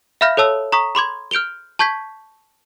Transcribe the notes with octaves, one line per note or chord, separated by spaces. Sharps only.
E5 F5 B5 F6 G6 A#6
A4 C#5 A5 E6
A#5 C#6 D#6 B6
B5 C6 D6 G#6
F6 G6 D7 F7 G7
A5 C#6 G6 G#6 B6